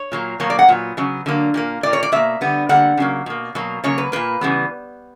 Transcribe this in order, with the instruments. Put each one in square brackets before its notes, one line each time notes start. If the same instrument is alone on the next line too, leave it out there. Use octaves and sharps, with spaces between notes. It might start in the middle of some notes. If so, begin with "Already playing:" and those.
Already playing: [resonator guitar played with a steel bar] C#5
A#2 F#3 A#3
B2 F#3 A#3 C#5
D5
F#5
A#2 F#3 B3
C#3 F#3 B3
D3 F#3 A#3
A#2 G3 A#3
A#2 A#3 D5
C#5
D5
B2 A#3 E5
D3 G3 B3
D3 G3 A#3 F#5
C#3 F#3 A#3
B2 A#3
B2 F#3 A#3
C#3 F#3 A#3 C#5
B4
A#2 A#3 B4
C#3 E3 G3 B3